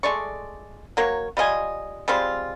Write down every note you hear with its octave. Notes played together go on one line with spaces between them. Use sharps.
G#3 A3 D5 C#6
F#3 A#3 C#5
G3 F4 D#5 G#5
G3 G#3 C4 F4